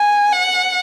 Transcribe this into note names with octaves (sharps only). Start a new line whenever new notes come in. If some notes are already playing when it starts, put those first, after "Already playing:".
Already playing: G#5
F#5